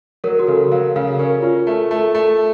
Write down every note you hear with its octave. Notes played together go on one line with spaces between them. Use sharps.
F#3 A#4
F#4
C#3 A4
F#3 F5
C#3 F5
C#4 A#4
C#4 F4
A3
A3
A3